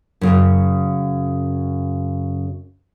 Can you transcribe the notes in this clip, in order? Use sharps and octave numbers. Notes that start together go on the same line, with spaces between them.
F#2 C#3